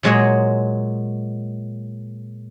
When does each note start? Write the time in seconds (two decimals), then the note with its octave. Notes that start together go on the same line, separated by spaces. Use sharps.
0.03 A#2 F#3 G#3 F#4 C#5 D#5